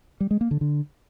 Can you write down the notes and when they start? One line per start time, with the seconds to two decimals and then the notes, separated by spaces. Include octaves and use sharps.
0.20 G3
0.31 G#3
0.41 A#3
0.51 D3
0.61 D3